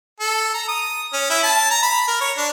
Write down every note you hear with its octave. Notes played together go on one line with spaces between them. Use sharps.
A4
A#5
D#6
C#4
E4
A5
A#5
B5
A#4
C#5
D4